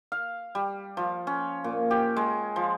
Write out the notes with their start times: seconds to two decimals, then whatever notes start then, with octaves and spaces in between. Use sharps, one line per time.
0.12 F5
0.55 G3
0.97 F3
1.27 C#4
1.64 A#2
1.91 G4
2.16 G#3
2.56 F3